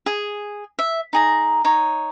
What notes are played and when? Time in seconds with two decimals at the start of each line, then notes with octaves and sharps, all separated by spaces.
0.06 G#4
0.79 E5
1.13 D#4 G#4 A#5
1.65 D#4 C#5